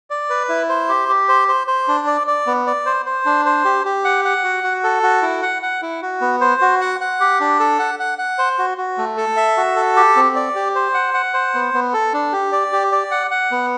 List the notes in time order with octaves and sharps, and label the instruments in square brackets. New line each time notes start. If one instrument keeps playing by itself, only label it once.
[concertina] D5
B4
E4
C5
G4
G4
C5
C5
C5
D4
D5
D5
B3
D5
C5
C5
D4
C5
G4
G4
F#5
F#5
F#4
F#4
A4
F#4
E4
F#5
F#5
E4
F#4
B3
C5
F#4
F#5
F#5
G4
D4
A4
F#5
F#5
F#5
C5
F#4
F#4
A3
A4
E5
F#4
A4
G4
C4
D5
G4
C5
F#5
F#5
C5
B3
B3
A4
D4
G4
D5
G4
D5
F#5
F#5
B3